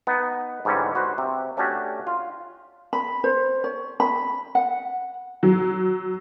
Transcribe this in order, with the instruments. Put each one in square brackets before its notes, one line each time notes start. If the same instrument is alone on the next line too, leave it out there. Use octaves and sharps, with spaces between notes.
[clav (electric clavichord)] B3 D#4
G#2 D3 E3 G3 C#4
F#4 B4 C5
C3
A3 C#4 D4 F#4 G4
F4
[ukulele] B5
C5
C#5
B5
F#5
[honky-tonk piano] F#3